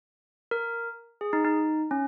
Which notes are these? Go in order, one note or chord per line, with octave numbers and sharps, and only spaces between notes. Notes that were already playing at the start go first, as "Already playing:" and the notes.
A#4
G#4
D#4
D#4
C#4